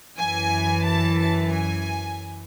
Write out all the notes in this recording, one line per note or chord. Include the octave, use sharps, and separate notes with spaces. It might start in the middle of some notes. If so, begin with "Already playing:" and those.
F#2 E3 G#5
A5
A5
G#5